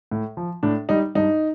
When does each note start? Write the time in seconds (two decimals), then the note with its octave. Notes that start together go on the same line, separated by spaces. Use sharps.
0.12 A2
0.37 F3
0.63 A2 D4
0.89 G3 D#4
1.15 G2 D#4